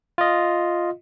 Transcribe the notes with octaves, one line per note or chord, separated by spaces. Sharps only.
F4 D#5